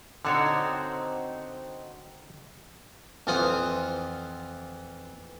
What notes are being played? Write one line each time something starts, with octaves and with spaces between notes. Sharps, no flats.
D3 C4 D#4 F#4 A4 C#5
F2 E3 F4 C5 F#5 D#6